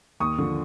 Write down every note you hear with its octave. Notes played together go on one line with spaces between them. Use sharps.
D#2 C#6 D#6
D3 F3